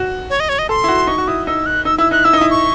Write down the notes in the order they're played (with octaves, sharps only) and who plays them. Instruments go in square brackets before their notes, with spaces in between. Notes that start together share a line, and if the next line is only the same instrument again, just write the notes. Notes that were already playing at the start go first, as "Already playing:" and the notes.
Already playing: [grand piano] F#4
[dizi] C#5
D#5
C#5
D#5
[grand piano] A4 [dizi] C6
[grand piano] E4
F#4
[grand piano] D#4 [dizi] C#6
[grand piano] F#4
[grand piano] E4 [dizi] D#6
[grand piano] D#4 [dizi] E6
[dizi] F#6
[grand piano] D#4 [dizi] E6
[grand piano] E4 [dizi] E6
[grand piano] D#4 [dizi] F#6
[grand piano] E4 [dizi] E6
[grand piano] D#4
[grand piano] E4 [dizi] D#6
[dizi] C#6